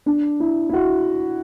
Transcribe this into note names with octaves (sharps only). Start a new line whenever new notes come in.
D4
E4
E4
F#4